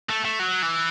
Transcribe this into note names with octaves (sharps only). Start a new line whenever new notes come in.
A3
A3
F#3
E3